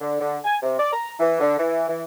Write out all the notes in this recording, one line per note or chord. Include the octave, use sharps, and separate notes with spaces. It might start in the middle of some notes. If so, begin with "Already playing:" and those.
D3
D3
G#5
C3
D5
A#5
E3
D3
E3
E3